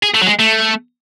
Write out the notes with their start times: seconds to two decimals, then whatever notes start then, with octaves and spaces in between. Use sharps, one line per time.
0.03 G#4
0.15 A3
0.22 F#3
0.27 G#3
0.39 A3